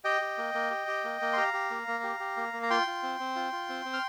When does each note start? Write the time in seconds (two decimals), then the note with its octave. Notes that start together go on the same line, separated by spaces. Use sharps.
0.04 G4 D#5 G5
0.21 G4
0.38 A#3
0.54 A#3
0.71 G4
0.88 G4
1.04 A#3
1.21 A#3
1.33 C6
1.37 G4 F5 A#5
1.53 G4
1.70 A#3
1.88 A#3
2.04 G4
2.20 G4
2.37 A#3
2.53 A#3
2.63 A#5
2.70 F4 G5 C6
2.87 F4
3.03 C4
3.20 C4
3.36 F4
3.52 F4
3.69 C4
3.85 C4
3.93 F6